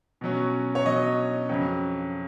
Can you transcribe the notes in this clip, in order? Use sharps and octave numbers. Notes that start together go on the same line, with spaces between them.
B2 F#3 C#4
C#5
B2 F#3 C#4 D#5
F2 C#3 F#3